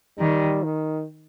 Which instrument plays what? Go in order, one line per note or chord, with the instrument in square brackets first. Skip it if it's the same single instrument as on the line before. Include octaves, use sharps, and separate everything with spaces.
[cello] D#3 [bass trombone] G3
[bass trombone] D#3